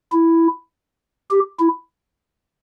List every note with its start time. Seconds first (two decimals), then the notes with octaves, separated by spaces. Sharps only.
0.12 E4
1.30 G4
1.60 E4